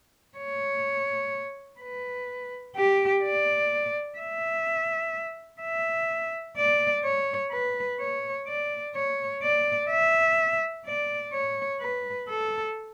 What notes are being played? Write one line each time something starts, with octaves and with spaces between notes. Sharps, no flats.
C#5
B4
G4
D5
E5
E5
D5
C#5
B4
C#5
D5
C#5
D5
E5
D5
C#5
B4
A4